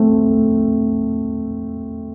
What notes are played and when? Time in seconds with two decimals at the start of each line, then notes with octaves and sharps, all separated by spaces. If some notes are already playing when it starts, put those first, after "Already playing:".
Already playing: A3 C4